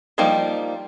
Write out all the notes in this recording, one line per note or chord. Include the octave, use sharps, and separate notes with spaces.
F3 G3 A#3 D#4